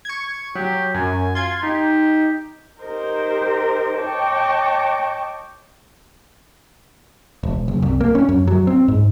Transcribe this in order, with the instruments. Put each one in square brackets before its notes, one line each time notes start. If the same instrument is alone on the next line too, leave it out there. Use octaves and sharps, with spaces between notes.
[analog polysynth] C#6 G#6
[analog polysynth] F#3 [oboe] G4
[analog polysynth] F#2 [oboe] G#5
[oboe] F4 [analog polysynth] C6 G#6
[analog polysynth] D#4 [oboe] G4
[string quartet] D#4 G4 A#4 C5
C#5 D#5 G5 A5 C#6 D6
[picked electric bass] E1
F#1
C2
A#3
C#4
F#2
F#3
C4
G#2